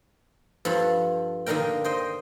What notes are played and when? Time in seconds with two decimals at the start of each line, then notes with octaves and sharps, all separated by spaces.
0.65 G2 F3 A4 B5
1.46 D3 D#3 A#3 D4 A#4 G5
1.84 C5 D#5 G5